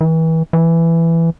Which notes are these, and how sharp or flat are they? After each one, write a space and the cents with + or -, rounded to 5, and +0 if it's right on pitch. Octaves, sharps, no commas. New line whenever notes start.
E3 -30
E3 +10